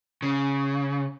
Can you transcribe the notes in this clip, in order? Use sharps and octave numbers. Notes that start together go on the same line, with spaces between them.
C#3